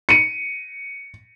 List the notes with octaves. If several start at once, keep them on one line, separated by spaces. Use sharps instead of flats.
C#7 D#7